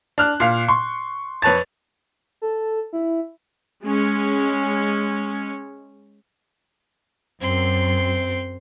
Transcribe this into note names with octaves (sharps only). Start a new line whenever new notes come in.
D4 F6 F#6
A#2 F5
C6 C#6
F2 B4 C#5 A5 A6
A4
E4
G#3 C#4
F#2 C4 C6